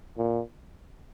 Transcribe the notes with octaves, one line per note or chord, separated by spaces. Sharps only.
A#2